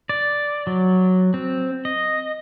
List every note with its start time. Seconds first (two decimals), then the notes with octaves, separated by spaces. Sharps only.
0.09 D5
0.67 F#3
1.34 C4
1.85 D#5